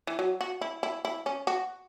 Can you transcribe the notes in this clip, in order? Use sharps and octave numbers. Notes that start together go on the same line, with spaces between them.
E3
F#3
F#4
E4
E4
E4
C#4
F#4